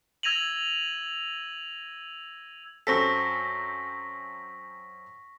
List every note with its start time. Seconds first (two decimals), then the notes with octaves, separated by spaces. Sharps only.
0.23 E6 G#6 A#6 D#7 F7 F#7
2.87 F#2 C4 A4 C#6 A#6 B6